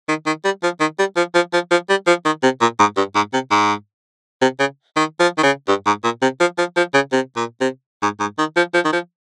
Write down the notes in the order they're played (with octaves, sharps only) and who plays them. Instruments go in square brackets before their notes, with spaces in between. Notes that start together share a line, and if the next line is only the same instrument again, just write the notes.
[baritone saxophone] D#3
D#3
G3
F3
D#3
G3
F3
F3
F3
F3
G3
F3
D#3
C3
A#2
G#2
G2
G#2
C3
G#2
C3
C#3
D#3
F3
D#3
C#3
G2
G#2
A#2
C3
F3
F3
F3
C#3
C3
A#2
C3
G#2
G#2
D#3
F3
F3
D#3
F3